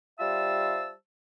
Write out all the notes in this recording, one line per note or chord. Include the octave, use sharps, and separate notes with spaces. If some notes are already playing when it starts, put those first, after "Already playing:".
G3 F4 C5 E5 A5 E6